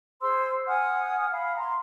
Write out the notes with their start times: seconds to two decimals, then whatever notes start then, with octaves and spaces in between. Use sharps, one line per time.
0.21 G#4 C5 C6 E6
0.67 F#5 G#5 D#6 F6
1.32 F5 B5
1.58 A#5 C6